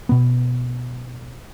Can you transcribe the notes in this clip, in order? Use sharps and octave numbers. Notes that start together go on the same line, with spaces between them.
B2 B3